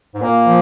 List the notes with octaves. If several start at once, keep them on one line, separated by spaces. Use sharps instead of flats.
G#2
A#2 A#3
F3